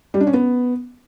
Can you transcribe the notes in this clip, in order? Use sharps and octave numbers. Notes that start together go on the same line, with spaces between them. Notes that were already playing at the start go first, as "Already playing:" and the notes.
G3
D4
C#4
B3